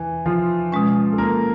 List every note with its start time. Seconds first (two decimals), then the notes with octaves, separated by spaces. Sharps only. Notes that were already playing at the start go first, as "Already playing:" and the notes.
Already playing: E2 B2 E3
0.26 F3 F4
0.72 B2 G#3 C#4
1.12 A4
1.18 A#3 A#4